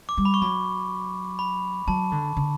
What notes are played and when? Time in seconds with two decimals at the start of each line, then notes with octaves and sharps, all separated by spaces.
0.09 D6
0.17 G3
0.25 B5
0.34 C#6
0.42 F#3 B5
1.39 B5
1.87 F#3 A5
2.12 D3
2.37 D3